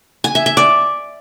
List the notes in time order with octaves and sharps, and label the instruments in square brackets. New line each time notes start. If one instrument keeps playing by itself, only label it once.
[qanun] G#5
E5
E5
D5